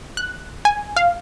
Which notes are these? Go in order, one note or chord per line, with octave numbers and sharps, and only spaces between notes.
F#6
G#5
F5